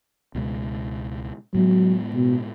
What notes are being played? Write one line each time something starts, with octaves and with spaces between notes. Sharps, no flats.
C#2 B2 G#3
A2 F#3 G#3 B3
B2